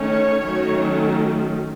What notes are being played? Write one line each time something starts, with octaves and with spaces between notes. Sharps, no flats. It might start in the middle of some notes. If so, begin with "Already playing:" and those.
Already playing: D#3 A3 C#4 C#5
D#3 F#3 A3 C#4